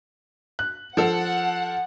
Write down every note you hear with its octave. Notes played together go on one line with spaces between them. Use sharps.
F#6
F3 A4 F#5